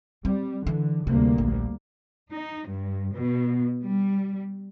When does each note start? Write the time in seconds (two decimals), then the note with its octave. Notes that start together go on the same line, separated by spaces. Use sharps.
0.25 G3 C4
0.67 D3 E3
1.07 D2 C3 G3 A#3
1.38 A#1
2.30 D#4
2.66 G2
3.15 B2
3.84 G3